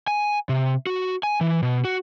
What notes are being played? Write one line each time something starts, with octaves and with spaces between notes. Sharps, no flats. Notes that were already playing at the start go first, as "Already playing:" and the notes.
G#5
C3
F#4
G#5
E3
B2
F#4